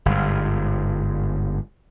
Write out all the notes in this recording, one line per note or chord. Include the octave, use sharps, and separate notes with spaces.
G1 G#2